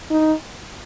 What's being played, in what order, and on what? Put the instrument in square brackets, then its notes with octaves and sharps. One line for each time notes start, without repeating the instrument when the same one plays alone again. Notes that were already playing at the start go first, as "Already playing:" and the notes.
[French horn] D#4